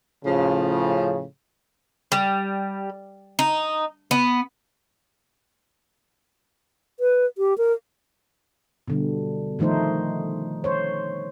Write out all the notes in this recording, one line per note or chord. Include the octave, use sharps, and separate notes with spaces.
A2 C#3 F3
G3
D#4
B3
B4
G4
A#4
B2 D3 G3
D#3 F3 A3 D#4 C5
C5 C#5